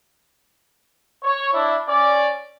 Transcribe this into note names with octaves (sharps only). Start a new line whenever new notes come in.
C#5
D4 E4
C#4 D5